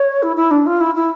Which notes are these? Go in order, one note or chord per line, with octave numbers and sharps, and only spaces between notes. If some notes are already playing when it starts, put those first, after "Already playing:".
Already playing: C#5
E4
E4
D4
F4
E4
E4